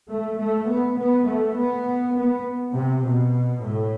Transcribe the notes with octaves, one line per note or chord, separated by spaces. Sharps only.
A3
A3
B3
B3
A3
B3
B3
C3
B2
A2